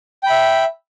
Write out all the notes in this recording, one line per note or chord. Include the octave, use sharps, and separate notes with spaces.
E5 G5 B5